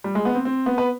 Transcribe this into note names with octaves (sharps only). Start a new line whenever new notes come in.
G3
G#3
B3
C4
C4
B3
B4